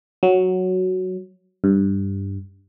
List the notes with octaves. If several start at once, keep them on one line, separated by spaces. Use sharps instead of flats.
F#3
G2